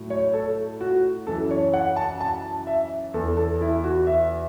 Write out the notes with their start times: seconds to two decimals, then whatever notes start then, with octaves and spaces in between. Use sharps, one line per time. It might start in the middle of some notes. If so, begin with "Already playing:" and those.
Already playing: A2 F#3
0.10 C#5
0.33 A4
0.81 F#4
1.27 F#2 E3 A4
1.51 C#5
1.74 F#5
1.96 A5
2.20 A5
2.67 E5
3.14 E2 E3 A4
3.37 A4
3.61 E4
3.84 F#4
4.07 E5